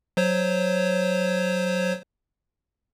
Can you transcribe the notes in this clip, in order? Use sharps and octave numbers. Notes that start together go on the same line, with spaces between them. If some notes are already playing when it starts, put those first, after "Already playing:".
F#3 C5 C#5